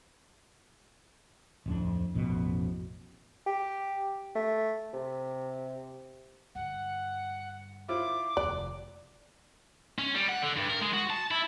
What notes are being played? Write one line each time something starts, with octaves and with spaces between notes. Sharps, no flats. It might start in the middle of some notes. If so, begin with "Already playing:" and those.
D1 F2 D4
A1 F2 B2
G4
A3
C3
G2 D3 F#5
E4 F4 C5 D6
F1 D#2 D5 F#6
C#4
G3
F#5
D3
G2
A#4
G#3
F#4
A5
E4